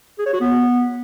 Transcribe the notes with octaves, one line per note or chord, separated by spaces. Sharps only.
G#4
C#5
F#4
B3